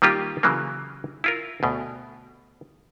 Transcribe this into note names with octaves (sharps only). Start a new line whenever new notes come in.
D#3 G3 A#3 F4 G4
C#3 E3 F#3 A#3
E4 F4 A#4
D2 B2